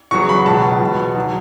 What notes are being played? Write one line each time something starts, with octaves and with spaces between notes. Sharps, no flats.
E2 C#3 F#3 C#6
B5
C#2 B2 F#3 A5
E2 B2 F#3
D#3 F#3